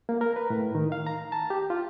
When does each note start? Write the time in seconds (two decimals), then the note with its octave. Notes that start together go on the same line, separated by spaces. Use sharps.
0.09 A#3
0.21 A#4
0.36 B4
0.50 A2
0.75 D#3
0.92 F5
1.07 A#5
1.32 A5
1.50 G4
1.70 F4